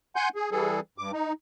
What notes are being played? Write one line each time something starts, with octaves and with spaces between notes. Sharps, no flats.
F#5 G#5 C6 G6
G#4
E3 G3 G#4 A4
G2 D6
D#4